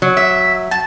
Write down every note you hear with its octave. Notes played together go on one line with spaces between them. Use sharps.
F#3
E5
A5